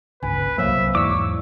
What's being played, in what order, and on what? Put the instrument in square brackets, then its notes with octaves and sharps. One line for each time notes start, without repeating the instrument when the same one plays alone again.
[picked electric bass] G1 C#2 [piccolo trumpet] B4 [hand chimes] G#5
[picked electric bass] C2 F#3 A#3 [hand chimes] C5 C#5 F5 [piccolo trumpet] E5
[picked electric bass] E2 G#2 [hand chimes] E4 D5 [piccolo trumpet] C#6 [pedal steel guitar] D6 E6